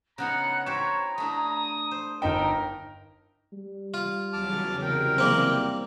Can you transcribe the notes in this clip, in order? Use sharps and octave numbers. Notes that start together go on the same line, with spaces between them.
C#3 B3 D#4 F#5 A#5 F#6
E4 G4 C5 C#5 A#5 E7
A3 D4 E4 D#6
C5
G1 D#4 A#4 E5 G5
G3
F4
E2 C#3 F#3 A5 D6 F6
C2 A#4 G5
G3 A#3 C4